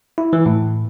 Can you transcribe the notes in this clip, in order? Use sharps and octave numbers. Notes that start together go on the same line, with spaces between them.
E4
E3
A2